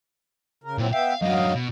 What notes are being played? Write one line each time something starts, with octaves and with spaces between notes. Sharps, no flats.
C#3 A#4
A#2 F#3 C4 E4
B3 E5 F5 G5
F#2 F#3 D4 D#5 F5
B2